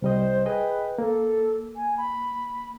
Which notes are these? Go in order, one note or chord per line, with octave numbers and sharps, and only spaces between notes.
C2 G3 C5 D#5
G#4 B4 D#5 G5
A#3 A4
G#5
B5